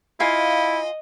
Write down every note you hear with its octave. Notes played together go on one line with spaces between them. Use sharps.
E4 F4 D#5 F5 G#5